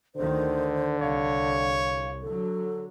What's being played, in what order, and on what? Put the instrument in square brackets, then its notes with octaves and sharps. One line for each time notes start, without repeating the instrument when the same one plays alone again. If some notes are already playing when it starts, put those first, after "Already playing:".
[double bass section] D2 D#3 [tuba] D3 [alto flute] C5
[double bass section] C2 [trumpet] C#5 [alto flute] F5
[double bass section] D3 F#3 [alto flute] A4